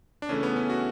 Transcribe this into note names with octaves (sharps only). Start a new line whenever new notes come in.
D4
C#3 E3 A3 C#4
B3
C#4
F#4